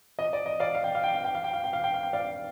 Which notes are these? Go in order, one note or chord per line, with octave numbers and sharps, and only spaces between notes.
D#5
D5
D#5
D5 F5
F5
G5
F5
G5
F5
G5
F5
G5
F5
G5
F5
G5
F5
G5
D5 F5